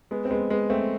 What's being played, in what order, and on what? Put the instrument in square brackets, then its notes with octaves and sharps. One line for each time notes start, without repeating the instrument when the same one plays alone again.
[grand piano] G#3 B3
C4
G#3 B3
G#3 B3
A3 C4